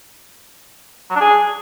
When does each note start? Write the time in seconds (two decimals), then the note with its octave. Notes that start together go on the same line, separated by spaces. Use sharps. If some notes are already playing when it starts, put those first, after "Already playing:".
1.10 F#3
1.16 D4
1.21 G#4